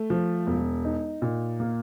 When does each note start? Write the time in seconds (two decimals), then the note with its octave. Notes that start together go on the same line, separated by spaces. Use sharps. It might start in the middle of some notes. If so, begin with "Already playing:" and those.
Already playing: A3
0.10 F3
0.47 E1
0.84 D#4
1.22 A#2
1.60 A#3